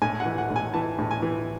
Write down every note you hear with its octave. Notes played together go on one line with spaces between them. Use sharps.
A2 G#5
F#5
E3
F#5
A2
G#5
E3 A5
A2
G#5
E3